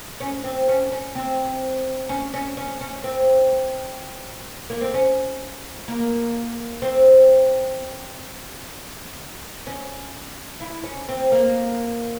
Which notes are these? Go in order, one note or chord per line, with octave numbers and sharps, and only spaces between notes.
C#4
C4
C#4
C#4
C4
C#4
C#4
C#4
C#4
C4
A#3
C4
C#4
A#3
C4
C#4
E4
C#4
C4
A#3